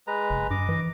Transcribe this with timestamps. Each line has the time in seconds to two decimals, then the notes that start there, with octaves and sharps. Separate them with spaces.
0.07 G#3 B4 A#5
0.30 F#1
0.50 G2 D#5 D6
0.69 E3